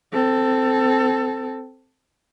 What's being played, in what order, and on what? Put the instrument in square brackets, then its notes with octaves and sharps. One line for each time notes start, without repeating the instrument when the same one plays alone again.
[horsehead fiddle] C4 A4